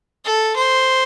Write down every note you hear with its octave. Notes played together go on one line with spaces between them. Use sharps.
A4
C5